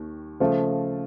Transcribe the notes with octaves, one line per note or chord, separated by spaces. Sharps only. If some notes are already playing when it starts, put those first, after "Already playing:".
Already playing: D#2 D#3
C#3 F3 A3